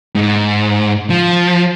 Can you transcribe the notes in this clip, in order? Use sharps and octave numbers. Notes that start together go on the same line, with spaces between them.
G#2
F3